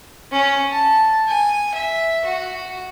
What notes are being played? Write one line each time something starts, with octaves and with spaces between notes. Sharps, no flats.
C#4
A5
G#5
E5
F#4